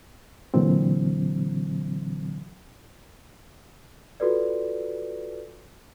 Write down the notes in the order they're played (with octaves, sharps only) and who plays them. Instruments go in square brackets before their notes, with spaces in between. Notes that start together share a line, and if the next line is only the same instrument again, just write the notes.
[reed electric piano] A#2 D3 E3 F#3 C4
[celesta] F4 F#4 A4 B4 D5